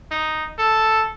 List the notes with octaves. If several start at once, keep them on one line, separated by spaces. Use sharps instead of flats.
D#4
A4